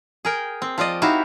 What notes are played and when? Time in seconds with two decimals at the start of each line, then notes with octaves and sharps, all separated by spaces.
0.25 G#4 A#4 G5
0.62 C4
0.78 F3 F4 D5 D#5
1.02 D#4 E4 F#4 G4 E5 F5